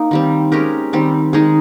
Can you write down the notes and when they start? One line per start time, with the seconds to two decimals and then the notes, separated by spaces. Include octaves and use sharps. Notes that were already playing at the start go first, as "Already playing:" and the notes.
Already playing: A#3 D#4
0.11 D#3 G3 C4
0.52 G#3 C#4 G4 A#4
0.93 D#3 G3 C4
1.33 D#3 G#3 D#4 G#4